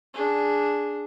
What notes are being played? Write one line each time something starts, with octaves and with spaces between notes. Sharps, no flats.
D4 G#4